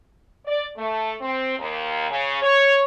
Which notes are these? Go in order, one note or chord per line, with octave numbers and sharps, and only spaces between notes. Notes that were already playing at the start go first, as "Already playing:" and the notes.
D5
A3
C4
D#2
C#3
C#5